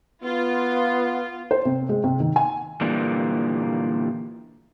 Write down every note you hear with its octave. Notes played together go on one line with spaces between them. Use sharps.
B3 F4
C5
C3
G#3
C3
D#3
G#5
A#2 D3 E3 G3 A#3